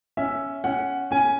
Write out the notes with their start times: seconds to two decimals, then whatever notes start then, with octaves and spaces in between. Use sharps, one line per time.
0.17 C#4 E5
0.64 C#4 F#5
1.11 C#4 G#5